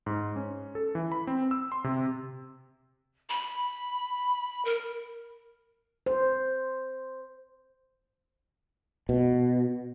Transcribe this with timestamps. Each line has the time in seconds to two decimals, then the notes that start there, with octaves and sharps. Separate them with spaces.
0.06 G#2
0.36 C#4
0.75 A4
0.95 E3
1.12 B5
1.27 C4
1.51 E6
1.72 C6
1.84 C3
3.29 B5
4.65 A#4
6.06 C5
9.09 B2